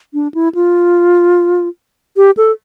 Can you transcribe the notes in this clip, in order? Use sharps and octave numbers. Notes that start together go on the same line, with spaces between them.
D4
E4
F4
G4
A4